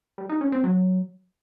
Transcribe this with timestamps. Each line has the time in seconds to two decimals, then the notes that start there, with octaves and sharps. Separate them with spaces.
0.18 G3
0.29 D#4
0.41 C#4
0.52 C4
0.64 F#3